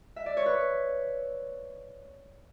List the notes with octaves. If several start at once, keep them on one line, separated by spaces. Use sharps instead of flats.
E5
D5
C#5
B4